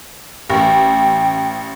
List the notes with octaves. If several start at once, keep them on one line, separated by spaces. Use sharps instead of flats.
A1 G5